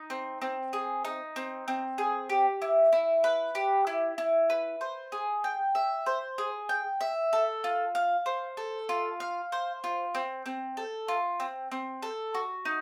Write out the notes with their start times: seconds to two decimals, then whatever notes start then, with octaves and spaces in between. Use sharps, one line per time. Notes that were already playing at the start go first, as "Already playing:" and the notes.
Already playing: D#4
0.10 C4
0.42 C4
0.73 G#4
1.05 D#4
1.36 C4
1.68 C4
1.98 G#4
2.29 G4
2.62 E4
2.93 E4
3.24 B4
3.55 G4
3.87 E4
4.18 E4
4.50 B4
4.81 C5
5.12 G#4
5.44 G5
5.75 E5
6.06 C5
6.38 G#4
6.69 G5
7.01 E5
7.33 A4
7.64 F4
7.95 F5
8.26 C5
8.57 A4
8.89 F4
9.20 F5
9.52 C5
9.84 F4
10.15 C4
10.46 C4
10.77 A4
11.08 F4
11.40 C4
11.72 C4
12.02 A4
12.35 F#4
12.65 D#4